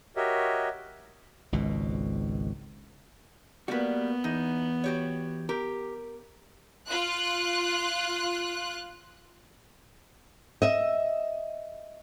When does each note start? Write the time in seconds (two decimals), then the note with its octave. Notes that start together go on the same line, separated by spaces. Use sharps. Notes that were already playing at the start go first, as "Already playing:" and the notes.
0.16 F#4 G4 A#4 C#5 D#5 E5
1.52 G#1 C#2 B2
3.68 G3 A#3 B3 F#4 B4
4.24 E2 D#4
4.84 F#4 G4 C#5
5.49 G4 A#4
6.87 F4 F#6
10.62 D#5 E5